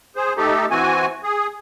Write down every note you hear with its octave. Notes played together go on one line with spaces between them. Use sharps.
G#4 C5
A3 D#4 G4 A4
E3 C4 F#4 G#5
G#4